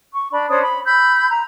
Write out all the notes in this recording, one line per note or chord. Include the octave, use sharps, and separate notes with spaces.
C#6
D4 B5
C#4 D4 C5 D#6
B5
B5 E6 G6
A#5